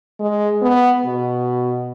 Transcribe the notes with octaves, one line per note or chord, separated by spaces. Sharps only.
G#3
B3
B2